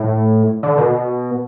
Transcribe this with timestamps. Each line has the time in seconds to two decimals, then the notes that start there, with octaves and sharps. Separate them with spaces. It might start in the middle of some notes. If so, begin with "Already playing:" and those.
Already playing: A2
0.63 D3
0.78 B2